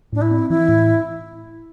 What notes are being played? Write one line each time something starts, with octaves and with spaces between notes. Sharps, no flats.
A2 D4
E4
C4
E3 E4
A2